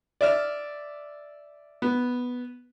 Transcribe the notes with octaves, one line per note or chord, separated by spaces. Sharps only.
D5 E5 F6
B3